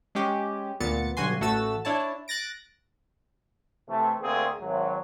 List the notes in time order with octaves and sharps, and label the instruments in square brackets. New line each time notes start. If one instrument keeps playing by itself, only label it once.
[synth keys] G#3 C#4 G4
D2 A#2 B3 A6 C#7
B1 G2 D3 F#4 G#5 C6
A1 A3 F#4 A4 E6 A6
D4 E4 C#5 A5
F#6 A6 A#6 D7
[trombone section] C3 E3 A3
D2 A#3 C4 G#4
G#1 F#3